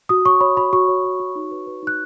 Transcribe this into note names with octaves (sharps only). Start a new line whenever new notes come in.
F#4 D#6
C#5 C#6
C#5 B5
F#4 B5
F#4 C#6
C#5
C#5
F#4
D#4
B4
B4
D#4 F#6